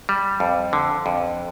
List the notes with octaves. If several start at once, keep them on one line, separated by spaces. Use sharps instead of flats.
G3
F2
D3
F2